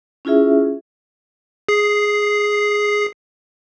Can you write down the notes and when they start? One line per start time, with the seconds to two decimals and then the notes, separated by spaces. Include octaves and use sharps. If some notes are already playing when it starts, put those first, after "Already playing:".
0.25 C#4 E4 F4 G#4 E5
1.69 G#4 C7